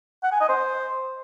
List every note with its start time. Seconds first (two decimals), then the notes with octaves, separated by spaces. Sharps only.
0.23 F#5
0.32 G#5
0.40 D#5
0.49 C5